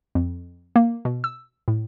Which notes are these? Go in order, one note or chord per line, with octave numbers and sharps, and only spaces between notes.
F2
A#3
B2
E6
A2